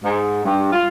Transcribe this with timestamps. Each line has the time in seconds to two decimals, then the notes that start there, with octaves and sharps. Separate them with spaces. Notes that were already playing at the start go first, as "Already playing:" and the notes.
0.03 G#2
0.44 G2
0.72 F4